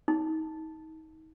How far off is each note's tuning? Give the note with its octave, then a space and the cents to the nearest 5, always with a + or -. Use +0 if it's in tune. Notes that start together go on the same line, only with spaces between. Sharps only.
D#4 +30